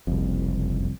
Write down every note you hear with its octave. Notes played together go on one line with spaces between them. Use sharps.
F#1 C2 F2